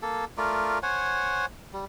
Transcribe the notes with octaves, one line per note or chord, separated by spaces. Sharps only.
A#3 A4
A3 F4 A#4 D5
C5 C#5 F#5 G#5
G3